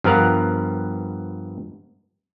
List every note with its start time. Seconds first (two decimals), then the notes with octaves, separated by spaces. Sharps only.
0.04 G2 F3 B3 A#4 F5 F#5